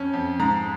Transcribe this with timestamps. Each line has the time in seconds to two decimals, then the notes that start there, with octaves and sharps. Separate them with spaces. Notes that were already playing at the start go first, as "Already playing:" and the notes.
Already playing: F2 C#4
0.13 F2
0.40 G#2 A#5